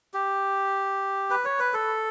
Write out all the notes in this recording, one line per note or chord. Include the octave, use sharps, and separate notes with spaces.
G4
B4
C#5
B4
A4